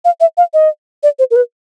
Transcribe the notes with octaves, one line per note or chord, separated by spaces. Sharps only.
F5
E5
F5
D#5
D5
C5
A#4
B4